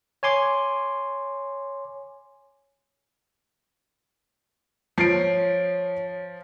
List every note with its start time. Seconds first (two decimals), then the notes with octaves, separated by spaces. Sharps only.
0.23 C#5 G#5 C6 D6
4.98 F3 C#5 C7 D7